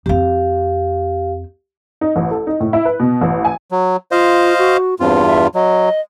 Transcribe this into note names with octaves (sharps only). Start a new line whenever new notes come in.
F2 C4 G4 F5
D#4
A1
A4
D#4
A2
E4
B4
B2
A1
G#5
F#3
F4 C5 D#5 F5
F#4
E2 G2 C4 F4
E5
F#3 D#5